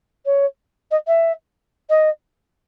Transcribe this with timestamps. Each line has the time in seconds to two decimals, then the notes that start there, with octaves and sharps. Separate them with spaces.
0.25 C#5
0.91 D#5
1.07 E5
1.89 D#5